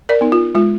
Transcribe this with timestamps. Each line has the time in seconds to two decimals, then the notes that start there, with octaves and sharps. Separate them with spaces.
0.09 A#4 D5
0.21 B3 D#4
0.32 F4
0.55 G#3 F4